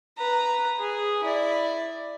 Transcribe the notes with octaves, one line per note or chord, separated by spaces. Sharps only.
B4 A#5
G#4
E4 D5